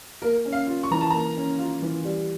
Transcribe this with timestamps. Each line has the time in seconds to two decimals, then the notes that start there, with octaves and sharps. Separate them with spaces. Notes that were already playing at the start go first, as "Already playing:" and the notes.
0.22 A#3 A#4
0.45 C#4
0.52 F5
0.67 F4
0.83 C#6
0.91 E3 A#5
1.01 A5
1.10 A#3 A#5
1.36 C#4
1.59 F4
1.82 E3
2.04 G3